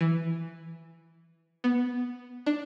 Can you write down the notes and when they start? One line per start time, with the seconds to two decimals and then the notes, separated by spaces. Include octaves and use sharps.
0.01 E3
1.64 B3
2.46 D4